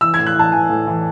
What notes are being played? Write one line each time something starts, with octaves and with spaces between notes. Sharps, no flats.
E3 E6
G#6
A2
F#6
E3 A5
E3 G#5
A2
E3